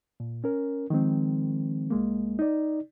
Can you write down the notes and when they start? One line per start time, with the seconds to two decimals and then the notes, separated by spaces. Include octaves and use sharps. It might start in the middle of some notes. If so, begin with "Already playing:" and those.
0.20 A#2
0.44 C#4 A#4
0.90 D#3 F3 G#3 C4
1.90 C2 G#3 A#3
2.39 D#4 D5